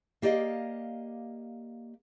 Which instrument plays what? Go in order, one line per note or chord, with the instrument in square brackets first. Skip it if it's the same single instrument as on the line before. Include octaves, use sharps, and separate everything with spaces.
[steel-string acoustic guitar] A#3 G4 D5 D#5 F5